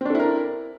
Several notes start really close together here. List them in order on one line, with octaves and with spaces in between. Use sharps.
C4 D4 A4 E4 A#4